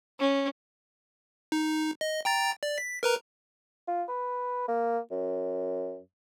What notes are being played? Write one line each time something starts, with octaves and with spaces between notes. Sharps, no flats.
C#4
D#4
D#5
G5 A#5 A6
D5
B6
A#4 B4 A#5
F4
B4
A#3
F#2